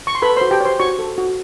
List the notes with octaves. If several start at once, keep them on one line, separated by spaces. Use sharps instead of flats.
C#6
C6
A4 B4 B5
C5 C6
F#4
G4 G5
C5 C#5 C6
F#4 C#5 C#6
A4
F#4